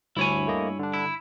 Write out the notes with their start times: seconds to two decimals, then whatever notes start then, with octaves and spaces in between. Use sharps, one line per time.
0.17 D2 G2 E4 C#5 G#5
0.47 A3 A#3 D#5
0.79 D3 D4
0.94 E4